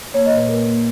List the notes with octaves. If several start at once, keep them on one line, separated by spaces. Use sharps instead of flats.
A#3 C#5
D#5
A#2
B4
A#3 A#4
A#3